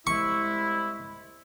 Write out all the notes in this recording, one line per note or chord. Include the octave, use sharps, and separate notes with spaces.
C2 G#3 E4 C#6